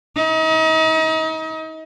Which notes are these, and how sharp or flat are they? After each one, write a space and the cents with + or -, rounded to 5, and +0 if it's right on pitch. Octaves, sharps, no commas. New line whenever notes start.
D#4 +40